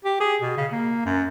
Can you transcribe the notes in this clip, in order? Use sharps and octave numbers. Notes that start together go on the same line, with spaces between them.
G4
G#4
B2
C#3
A#3
F#2